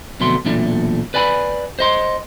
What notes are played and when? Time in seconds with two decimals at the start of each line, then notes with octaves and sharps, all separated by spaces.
0.20 B1 F2 B2 D3 A3 C6
0.45 B1 E2 A#2 A3 D4
1.14 B4 D5 G#5 B5
1.79 C5 D#5 C6